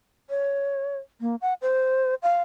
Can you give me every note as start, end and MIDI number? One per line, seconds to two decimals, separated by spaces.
0.30 0.97 73
1.21 1.36 58
1.41 1.54 78
1.62 2.15 72
2.23 2.42 77